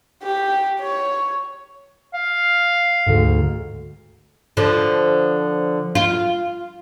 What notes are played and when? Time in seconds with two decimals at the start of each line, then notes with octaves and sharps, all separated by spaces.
0.24 G4
0.80 C#5
2.14 F5
3.06 D2 G#2
4.57 D3 F3
5.95 F4